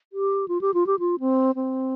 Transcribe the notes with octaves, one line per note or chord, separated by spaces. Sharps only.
G4
F4
G4
F4
G4
F4
C4
C4